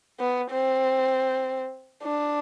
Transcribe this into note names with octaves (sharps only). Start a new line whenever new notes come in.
B3
C4
D4